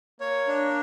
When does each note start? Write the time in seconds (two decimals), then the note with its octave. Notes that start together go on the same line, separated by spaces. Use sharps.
0.20 A#3 C#5
0.48 D4